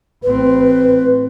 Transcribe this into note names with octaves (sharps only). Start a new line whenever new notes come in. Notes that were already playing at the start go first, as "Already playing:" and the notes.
A1 C4 B4